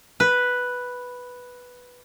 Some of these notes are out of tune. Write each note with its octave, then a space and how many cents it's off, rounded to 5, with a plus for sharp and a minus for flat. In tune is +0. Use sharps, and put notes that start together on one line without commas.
B4 +0